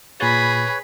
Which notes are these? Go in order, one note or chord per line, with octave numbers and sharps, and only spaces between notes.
A#2 G#4 B4 C#5 B5 A6